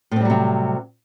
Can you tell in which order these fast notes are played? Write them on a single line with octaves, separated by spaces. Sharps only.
A2 C4 G3 F#3 C3